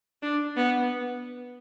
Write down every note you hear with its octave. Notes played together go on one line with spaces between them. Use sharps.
D4
B3